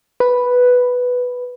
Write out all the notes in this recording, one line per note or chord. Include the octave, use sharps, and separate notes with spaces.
B4